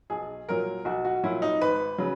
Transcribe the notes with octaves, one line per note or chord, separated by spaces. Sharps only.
B1 G#4
A#2 F#3 A#4
B1 F#4
F#4
A#2 F#3 E4
D#4
G#1 B4
C#3 F#3